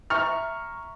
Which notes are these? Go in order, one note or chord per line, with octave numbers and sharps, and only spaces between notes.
E5 A#5 C#6 F6